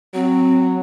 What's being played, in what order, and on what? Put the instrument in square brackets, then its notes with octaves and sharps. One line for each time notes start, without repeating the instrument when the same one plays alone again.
[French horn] F#3 [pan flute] C4